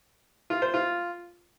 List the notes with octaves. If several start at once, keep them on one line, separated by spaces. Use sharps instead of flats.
F4
C5
F4